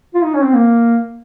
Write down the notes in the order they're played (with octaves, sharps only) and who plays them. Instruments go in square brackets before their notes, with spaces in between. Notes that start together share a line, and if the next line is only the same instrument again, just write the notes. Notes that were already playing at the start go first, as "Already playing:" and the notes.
[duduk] F4
D#4
C#4
C4
A#3